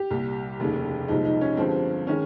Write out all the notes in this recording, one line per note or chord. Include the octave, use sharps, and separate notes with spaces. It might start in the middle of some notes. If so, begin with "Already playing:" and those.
Already playing: G4
C2 A#2 G3
F1 D#2 C#3
C2 A#2 F3 G#3 D#4
D#4
C#4
G1 G2 F3 G#3 C4
D#3 G#3 C#4